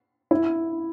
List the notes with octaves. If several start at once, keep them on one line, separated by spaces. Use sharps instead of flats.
E4